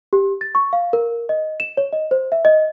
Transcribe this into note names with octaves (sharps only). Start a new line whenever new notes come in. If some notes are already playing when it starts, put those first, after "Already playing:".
G4
A6
C#6
F5
A#4
D#5
E7
C#5
D#5
C5
E5
D#5